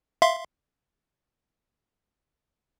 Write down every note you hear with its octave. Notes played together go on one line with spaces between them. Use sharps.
E5 F5 C6